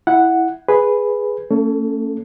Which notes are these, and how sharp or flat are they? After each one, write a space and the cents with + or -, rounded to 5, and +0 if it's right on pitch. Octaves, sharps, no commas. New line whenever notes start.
E4 +0 F#5 +0
G#4 +0 B4 +0
A3 +45 C#4 +5 A4 +0